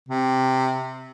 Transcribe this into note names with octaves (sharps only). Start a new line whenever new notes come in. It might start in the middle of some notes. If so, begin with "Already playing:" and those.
C3